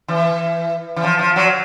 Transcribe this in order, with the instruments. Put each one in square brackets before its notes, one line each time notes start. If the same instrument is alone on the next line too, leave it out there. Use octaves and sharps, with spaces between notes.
[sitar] E3
E3
F3
F3
F#3